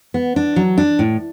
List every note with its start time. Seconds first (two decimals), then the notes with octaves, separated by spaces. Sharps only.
0.14 B3
0.36 D4
0.56 F#3
0.78 D4
0.99 A2